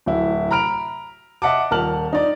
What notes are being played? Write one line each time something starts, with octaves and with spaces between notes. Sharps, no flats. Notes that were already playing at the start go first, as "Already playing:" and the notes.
D1 E4
A#5 B5 F6 D7 F7
D#5 E5 F#5 A5 D6
D#1 A#4 A5 F6 F#7
D#4 D5